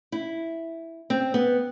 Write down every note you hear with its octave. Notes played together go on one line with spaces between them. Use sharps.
E4
C4
B3